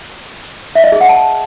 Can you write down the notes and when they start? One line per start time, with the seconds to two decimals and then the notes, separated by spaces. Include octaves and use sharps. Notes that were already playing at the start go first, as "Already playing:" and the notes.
0.75 E5
0.84 D#5
0.92 G#4
1.01 F#5
1.09 A5